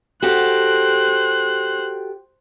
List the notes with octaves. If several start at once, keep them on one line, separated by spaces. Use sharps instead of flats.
F#4 G4 A4 C5 F#6